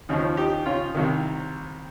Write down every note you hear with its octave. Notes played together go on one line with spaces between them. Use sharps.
D#2 C#3 F3 D#4
D#4 G4
C#4 F4
C2 C3 D#3